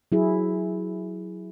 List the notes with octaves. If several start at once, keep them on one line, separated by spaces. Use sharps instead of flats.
F#3 E4 G#4